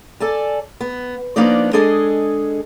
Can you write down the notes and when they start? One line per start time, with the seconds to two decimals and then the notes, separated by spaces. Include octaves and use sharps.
0.20 A4 D5 G#5 A5
0.81 B3
1.36 F3 A#3 B3 D4 D#4 D5
1.73 G#3 D4 G#4 A4 D#5